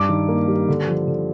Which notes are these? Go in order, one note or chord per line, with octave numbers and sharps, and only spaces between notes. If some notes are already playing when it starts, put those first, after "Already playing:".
Already playing: G2 D6
D#3
A#3
G3
D3
F3
D3